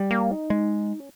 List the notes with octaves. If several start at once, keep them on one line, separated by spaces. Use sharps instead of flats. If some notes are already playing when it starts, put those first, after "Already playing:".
Already playing: G3
A#3
D#4
G#3
C#4